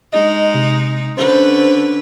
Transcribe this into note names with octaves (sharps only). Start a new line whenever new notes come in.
G#3 D#4 D#5
C3
D3 C#4 B4 C5